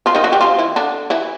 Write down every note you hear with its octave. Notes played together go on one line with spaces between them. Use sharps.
F3 F4
D#3 D#4
F#3 F#4
G3 G4
F3 F4
E3 E4
D3 D4
E3 E4